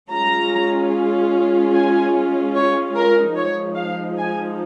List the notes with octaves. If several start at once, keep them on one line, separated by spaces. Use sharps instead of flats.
G#3 C#4 F4 A#5
G#5
C#5
A#4
F3 G#3 D#4 C#5
F5
G#5